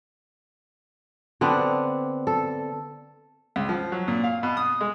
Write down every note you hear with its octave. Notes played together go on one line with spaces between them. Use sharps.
D3 B3 C4 D4
A4
C#2
F3
F#3
A#2
F5
B2
D#6
G#3